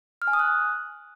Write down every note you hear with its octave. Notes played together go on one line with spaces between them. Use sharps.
F6
G#5
D#6
F#6